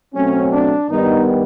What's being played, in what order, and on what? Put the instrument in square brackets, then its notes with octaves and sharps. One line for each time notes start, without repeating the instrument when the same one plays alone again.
[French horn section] B2 F#3 A3 C4 [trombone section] C#4
[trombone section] D4
[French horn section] G2 D#3 G3 B3 [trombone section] D#4